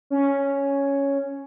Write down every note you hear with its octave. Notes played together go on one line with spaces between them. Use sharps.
C#4